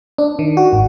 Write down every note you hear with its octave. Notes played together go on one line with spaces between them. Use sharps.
D4
D#3
F#4
G#1